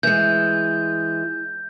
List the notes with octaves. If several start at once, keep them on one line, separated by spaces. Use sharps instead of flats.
E3 G#3 G6